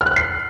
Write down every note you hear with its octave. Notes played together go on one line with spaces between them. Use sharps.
F6
F#6
F6
C7